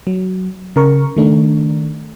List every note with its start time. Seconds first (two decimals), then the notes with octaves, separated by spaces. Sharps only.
0.07 F#3
0.76 C#3 A#4 C#6
1.17 D#3 A3 D4